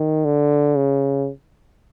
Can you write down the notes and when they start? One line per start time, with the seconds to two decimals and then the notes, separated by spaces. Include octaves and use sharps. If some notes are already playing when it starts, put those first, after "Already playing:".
Already playing: D#3
0.25 D3
0.76 C#3